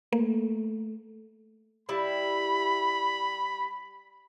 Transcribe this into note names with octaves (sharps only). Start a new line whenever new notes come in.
A3 A#3
G3 E4 B5